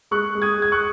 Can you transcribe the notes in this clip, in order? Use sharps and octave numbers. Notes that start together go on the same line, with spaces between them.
G#3 C#6 F#6
G#3
D#6 G#6
G#3 G#6
C#6 F#6